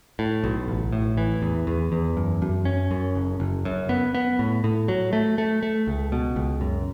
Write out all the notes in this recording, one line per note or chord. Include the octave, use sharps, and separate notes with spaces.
A2
B1
A1
A2
E3
E2
E2
E2
F#2
F#2
C#4
F#2
F#1
F#1
F#2
B3
B3
A2
A2
F#3
A3
A3
A3
C#2
B2
C#2
F#2